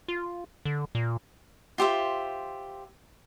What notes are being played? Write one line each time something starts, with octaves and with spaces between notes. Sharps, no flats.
F4
D3
A#2
F4 G4 C5 E5